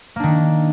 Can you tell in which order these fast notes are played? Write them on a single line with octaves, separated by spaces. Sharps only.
A#3 D4 D#3